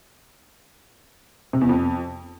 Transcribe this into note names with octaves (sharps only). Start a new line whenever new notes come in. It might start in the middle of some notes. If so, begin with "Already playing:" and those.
C3
E2
F2